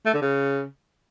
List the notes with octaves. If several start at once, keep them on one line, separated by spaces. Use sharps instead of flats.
A3
D3
C#3